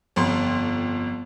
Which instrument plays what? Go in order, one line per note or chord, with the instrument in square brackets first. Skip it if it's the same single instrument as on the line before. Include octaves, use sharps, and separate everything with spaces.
[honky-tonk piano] G1 F2 C6